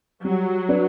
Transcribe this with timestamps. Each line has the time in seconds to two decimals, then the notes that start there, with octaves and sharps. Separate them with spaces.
0.24 F#3 G3
0.68 D4 F#4 B4 D5